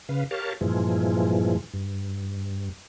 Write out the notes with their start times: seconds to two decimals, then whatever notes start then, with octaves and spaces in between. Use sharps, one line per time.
0.09 C#3 B4 F5
0.31 G4 A#4 C#5 F5 A5
0.61 G2 A#2 E3 F3 G#3
1.74 G2